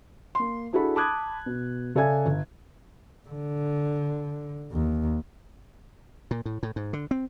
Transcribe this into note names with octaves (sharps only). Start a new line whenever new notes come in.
A#3 C6
D4 E4 F#4 G#4 A4 B5
A5 B5 D6 D#6 F#6 G#6
B2
C#3 A4 D5 E5 G#5 G#6
G1
D3
D#2
A#2
A2
A2
G#2
D3
C4